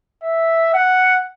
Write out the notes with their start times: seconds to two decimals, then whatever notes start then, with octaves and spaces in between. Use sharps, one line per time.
0.23 E5
0.74 F#5